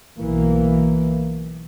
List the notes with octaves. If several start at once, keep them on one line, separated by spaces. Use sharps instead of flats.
B1 E3 A#3